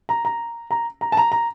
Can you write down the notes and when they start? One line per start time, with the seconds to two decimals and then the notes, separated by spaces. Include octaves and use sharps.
0.09 A#5
0.25 A#5
0.71 A#5
1.01 A#5
1.12 A5
1.17 A#5
1.32 A#5